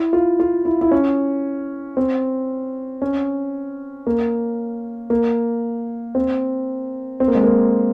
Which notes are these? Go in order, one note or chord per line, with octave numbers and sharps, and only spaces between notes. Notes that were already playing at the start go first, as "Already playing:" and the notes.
Already playing: E4
F4
F4
E4
E4
C#4
C4
C#4
A#3
A#3
C4
C4
A#3
G#3
A#3